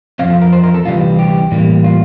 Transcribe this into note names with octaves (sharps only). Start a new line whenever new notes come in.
F2 C3 F3 C4 F5
A4
A#4
C5
A#4
A4
D2 C3 E3 G3 F4
G4
A2 E3 G3 A#3
F4